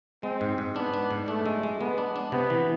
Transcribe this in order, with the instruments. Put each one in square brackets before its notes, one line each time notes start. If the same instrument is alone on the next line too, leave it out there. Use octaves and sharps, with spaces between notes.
[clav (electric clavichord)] G#3 [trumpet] C4
[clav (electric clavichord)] G#2
G#2
[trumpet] B3 [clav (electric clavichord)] D4
[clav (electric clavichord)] D4
G#2
[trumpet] A3 [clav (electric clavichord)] D4
[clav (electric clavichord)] G#3
G#3
[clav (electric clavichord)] G#3 [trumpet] B3
[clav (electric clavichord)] D4
D4
[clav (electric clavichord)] C3 [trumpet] B3
[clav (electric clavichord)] E3